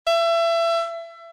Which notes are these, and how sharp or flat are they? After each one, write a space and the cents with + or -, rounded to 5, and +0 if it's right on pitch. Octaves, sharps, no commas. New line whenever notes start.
E5 +30